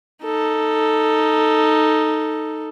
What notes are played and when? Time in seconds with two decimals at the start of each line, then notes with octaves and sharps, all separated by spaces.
0.23 D#4 A4